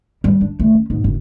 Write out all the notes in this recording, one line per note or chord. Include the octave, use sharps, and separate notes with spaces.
G3
D4
C3 A3
C#4
G#2 B2
F#1